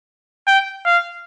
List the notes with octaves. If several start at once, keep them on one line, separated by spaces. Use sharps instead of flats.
G5
F5